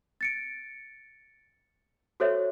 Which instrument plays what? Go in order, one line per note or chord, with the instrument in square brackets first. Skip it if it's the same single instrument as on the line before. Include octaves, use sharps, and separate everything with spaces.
[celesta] A6 C#7 D7
F#4 A4 C5 C#5 E5